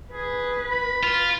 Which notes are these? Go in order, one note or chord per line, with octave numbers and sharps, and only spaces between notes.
G#4 B4
B5
F4